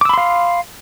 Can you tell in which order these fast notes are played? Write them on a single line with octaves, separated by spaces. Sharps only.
D6 E6 B5 C6 F5